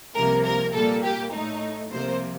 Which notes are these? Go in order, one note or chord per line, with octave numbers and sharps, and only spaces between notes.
C2 C3 F3 A#3 A#4
A#4
A#2 G3 A#3 A4
G4
A2 A3 D#4
C2 C3 F3 A#3 C5